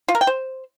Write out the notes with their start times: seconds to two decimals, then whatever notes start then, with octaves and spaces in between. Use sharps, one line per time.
0.08 F4
0.15 A#4
0.21 G5
0.27 C5